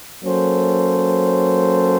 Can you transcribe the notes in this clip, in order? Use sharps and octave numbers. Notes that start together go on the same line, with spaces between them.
F#3 A#3 C#4 A4 C5